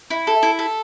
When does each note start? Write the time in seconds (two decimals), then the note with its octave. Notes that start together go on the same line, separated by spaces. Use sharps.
0.10 E4
0.27 A4
0.43 E4
0.59 A4